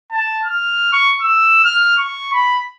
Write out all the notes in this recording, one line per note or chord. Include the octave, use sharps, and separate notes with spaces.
A5
F6
C#6
E6
F6
C#6
B5